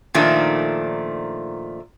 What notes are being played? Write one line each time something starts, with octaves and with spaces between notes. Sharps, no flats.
A#2 D#3 F3 A3 D4 D#4